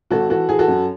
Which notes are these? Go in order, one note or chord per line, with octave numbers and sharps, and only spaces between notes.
G#1 F#4 A4
E3 F#4 A4
E3 G#4
F#4 A4
F#2